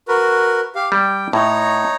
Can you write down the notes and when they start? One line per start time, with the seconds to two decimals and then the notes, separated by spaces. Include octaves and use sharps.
0.08 F#4 A#4 B4
0.75 G4 F5
0.92 G3 G5
1.33 A2 D#4 C#5 A#5